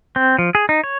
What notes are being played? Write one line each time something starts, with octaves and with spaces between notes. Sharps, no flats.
C4
F3
G#4
D#4
C#5